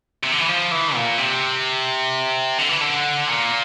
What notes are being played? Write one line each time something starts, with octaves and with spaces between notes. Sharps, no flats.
C3
D3
E3
F3
E3
A#2
C3
D3
E3
D3
A#2